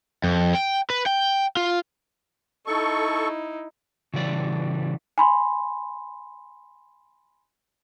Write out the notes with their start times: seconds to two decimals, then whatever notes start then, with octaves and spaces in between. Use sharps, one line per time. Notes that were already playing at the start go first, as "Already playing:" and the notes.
0.24 F2
0.55 G5
0.90 B4
1.06 G5
1.57 F4
2.67 D#4 E4 A4 C#6
4.14 C#3 E3 G3 D5
5.18 G#5 B5 C6